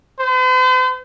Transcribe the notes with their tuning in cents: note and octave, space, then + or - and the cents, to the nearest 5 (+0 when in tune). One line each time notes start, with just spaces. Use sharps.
C5 -45